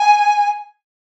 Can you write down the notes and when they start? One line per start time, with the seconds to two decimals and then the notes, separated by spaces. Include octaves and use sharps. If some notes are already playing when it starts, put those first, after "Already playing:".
Already playing: G#5